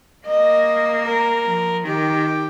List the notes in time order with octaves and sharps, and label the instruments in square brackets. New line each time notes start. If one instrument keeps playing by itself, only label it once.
[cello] A#3 [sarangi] D#5
[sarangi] A#4
[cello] F3
[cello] D#3 [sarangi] G4